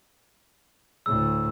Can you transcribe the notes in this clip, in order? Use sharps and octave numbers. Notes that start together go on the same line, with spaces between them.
D2 A2 E6